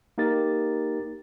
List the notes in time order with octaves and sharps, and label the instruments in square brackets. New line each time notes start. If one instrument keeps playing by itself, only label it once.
[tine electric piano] A#3 D#4 G4 A#4 A6